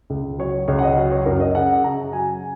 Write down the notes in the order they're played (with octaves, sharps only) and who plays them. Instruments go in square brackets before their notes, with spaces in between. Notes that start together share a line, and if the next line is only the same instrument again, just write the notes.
[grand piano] C#2
F#3 C#5
C#2 C#5
F#5
D#5
F#3 C#5
C#5
F#2 A#4
D#5
C#3 F#5
C#3 A#5
F#3 G#5